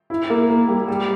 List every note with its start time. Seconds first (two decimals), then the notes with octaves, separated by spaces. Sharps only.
0.10 E4
0.30 A#3
0.50 A#3
0.68 G3
0.88 G3